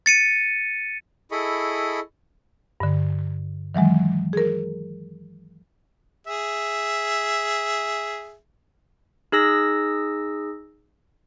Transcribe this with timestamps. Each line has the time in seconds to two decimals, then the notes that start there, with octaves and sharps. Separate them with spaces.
0.06 A6 C#7 D#7
1.31 E4 G#4 A4 D#5 B5 C#6
2.80 G2 D3
3.75 D#3 E3 F#3 G#3
4.33 G#4 A#4
6.27 G#4 E5
9.32 D#4 G#4 E6 A#6